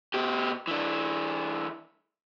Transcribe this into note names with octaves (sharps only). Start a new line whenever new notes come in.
B2 G4
E3 D4